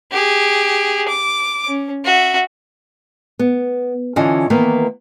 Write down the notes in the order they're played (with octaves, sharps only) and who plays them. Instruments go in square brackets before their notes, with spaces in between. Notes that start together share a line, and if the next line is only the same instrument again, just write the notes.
[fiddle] G4 G#4
D6
C#4
F#4 E5
[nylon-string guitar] B3
D3 E3 C#4 F4 D#5
D#3 E3 A#3 B3